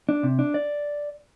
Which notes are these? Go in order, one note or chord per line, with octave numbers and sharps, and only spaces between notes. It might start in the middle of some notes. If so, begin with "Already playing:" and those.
D4
C3
D4
D5